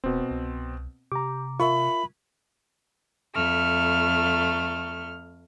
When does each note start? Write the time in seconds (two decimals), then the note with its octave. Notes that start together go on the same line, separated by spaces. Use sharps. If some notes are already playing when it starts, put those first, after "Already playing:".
0.04 D#1 B2 C4
0.31 C2
1.12 C3 G4 A#5 D6
1.60 F4 A#4 E5 B5 C#6
3.35 F2 A3 F6